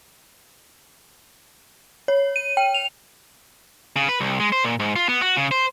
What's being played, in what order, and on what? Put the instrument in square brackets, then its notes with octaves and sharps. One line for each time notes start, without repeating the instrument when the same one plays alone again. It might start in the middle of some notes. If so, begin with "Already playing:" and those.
[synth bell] C#5
D#7
G5
F7
[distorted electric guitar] C#3
B4
C2
G#3
C5
A#2
G#2
F4
B3
F#4
C#3
C5